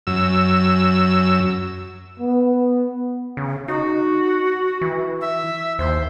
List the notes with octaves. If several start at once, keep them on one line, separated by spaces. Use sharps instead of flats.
F#2 E6
B3
C#3
D#4 F#4
E3
E5
D#2 C5